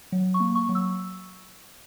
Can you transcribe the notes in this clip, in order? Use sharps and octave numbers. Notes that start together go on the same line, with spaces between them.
F#3
C#6
A#3
C#6
F#3
E6